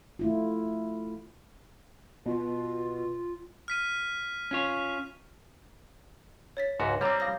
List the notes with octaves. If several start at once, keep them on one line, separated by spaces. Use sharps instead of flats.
A3 E4 F4
B2 F4
F6 B6 D#7
C#4 F4 C#5
C#5 A6 B6
C#2 G#2 F#4
G3 C4 C#5 A#5 D6
F5 D#6 A#6